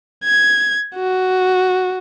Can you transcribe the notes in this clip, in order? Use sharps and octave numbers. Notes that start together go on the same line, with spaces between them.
G#6
F#4